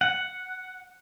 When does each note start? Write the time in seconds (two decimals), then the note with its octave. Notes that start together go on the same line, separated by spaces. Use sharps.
0.01 F#5